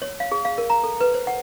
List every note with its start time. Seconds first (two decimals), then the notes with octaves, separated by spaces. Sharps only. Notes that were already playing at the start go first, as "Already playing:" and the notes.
0.02 C#5
0.20 F5
0.32 G#4
0.45 F5
0.58 A#4
0.70 A#5
0.83 A4
1.00 B4
1.14 C5
1.27 F#5